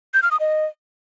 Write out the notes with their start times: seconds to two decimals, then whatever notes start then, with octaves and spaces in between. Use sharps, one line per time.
0.14 G6
0.23 F6
0.31 D#6
0.40 D#5